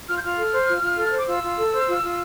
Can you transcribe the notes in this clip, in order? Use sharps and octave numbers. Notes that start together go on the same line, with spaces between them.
F4 F6
G6
F4 F6
A4
C5
F4
F4
A4
C6
C5
D6
F4 E6
F4
A4
C5
F4
F4